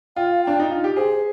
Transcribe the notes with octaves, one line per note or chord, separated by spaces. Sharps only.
F4 G5
F5
D4 G5
D#4
F4
G4
G#4 C5